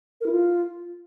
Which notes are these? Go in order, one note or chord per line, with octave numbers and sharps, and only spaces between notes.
A#4
E4
F4